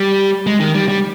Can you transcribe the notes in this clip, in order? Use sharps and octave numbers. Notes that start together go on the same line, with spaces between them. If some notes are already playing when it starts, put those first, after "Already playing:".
Already playing: G3
G#3
D#3
G3
G3